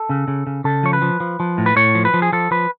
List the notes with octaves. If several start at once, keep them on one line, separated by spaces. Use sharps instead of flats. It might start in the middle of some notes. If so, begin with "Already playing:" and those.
Already playing: A4
C#3
C#3
C#3
C#3 A4
F3 C#5
B4
F3
F3
F3
A2
B4
A2 C#5
F3
B4
F3
G#4
F3 A4
F3 B4